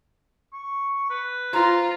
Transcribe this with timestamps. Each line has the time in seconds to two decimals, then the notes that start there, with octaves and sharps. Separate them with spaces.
0.53 C#6
1.10 B4
1.53 F4 C5 A#5